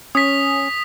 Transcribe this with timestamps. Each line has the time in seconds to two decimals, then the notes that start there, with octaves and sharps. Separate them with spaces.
0.15 C#4 D#6 B6